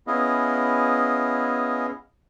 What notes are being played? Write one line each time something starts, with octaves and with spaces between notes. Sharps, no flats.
B3 C#4 E4 G#4 D#5 F5